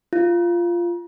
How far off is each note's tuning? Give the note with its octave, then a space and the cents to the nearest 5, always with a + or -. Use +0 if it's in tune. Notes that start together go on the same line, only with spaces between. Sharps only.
F4 -10